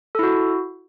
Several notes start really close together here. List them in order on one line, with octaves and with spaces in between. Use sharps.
A4 E4 F#4